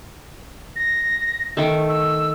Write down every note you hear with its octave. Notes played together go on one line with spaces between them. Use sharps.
A#6
D#3 A3
E6